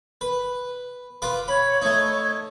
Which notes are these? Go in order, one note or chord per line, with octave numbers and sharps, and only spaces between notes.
B4
F4 B4 D6
C#5 B5
A3 D#4 C#5